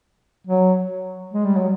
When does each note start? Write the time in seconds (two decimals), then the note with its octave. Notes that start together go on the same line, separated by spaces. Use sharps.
0.47 F#3
1.33 G#3
1.45 G3
1.57 F#3